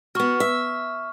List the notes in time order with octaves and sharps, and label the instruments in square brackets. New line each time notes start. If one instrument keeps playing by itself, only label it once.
[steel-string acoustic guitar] B3 F#4 [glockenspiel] C#6 F6
[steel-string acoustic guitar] E5